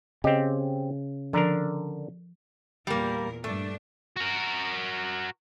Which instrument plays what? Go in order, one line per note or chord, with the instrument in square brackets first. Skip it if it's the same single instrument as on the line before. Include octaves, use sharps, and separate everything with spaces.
[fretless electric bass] C#3 [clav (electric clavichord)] C4 G4 [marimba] D#5
[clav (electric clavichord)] D3 D4 A#4 [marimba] F3 A#5
[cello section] E2 A#2 A#4 [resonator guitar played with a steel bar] G3 A#3
[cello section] G2 D4 [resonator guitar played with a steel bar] A3
[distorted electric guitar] F#4 A#4